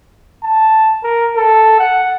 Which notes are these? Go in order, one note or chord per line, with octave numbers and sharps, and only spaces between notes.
A5
A#4
A4
F#5